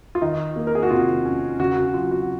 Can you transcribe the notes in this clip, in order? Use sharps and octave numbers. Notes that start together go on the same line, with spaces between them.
F4
D#3 D#4
A#3
A#4
G#4
F#4
C3 F4
C#4
C#3 F#4
F#4
F#3 F4
F#4